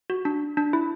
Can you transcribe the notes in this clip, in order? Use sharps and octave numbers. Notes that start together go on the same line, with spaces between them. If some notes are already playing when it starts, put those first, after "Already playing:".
F#4
D4
D4
E4